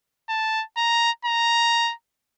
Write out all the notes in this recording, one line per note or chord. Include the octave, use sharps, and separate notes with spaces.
A5
A#5
A#5